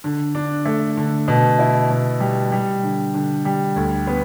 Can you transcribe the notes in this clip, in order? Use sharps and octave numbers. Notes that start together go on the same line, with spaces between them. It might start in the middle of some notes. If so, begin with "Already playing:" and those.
D3
D4
A3
D3
B2
E4
B2
G3
G3
D3
D3
G3
D2
B3